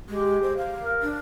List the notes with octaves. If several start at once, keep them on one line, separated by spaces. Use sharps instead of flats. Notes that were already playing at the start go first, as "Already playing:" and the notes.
G#3 G4
C5
F5
A#4
D4